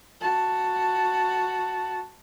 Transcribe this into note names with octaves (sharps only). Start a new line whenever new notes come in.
F#4 A5